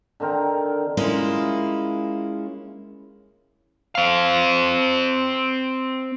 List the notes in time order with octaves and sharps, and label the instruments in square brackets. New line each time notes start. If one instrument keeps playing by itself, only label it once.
[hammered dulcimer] D3 D#3 C4 A#4
[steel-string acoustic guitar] G#3 A#3 C#4 E4 F4
[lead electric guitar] C4 F5